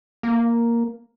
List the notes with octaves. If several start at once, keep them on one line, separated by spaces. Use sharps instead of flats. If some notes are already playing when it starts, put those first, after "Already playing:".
A#3